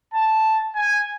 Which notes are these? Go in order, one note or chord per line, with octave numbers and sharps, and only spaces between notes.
A5
G#5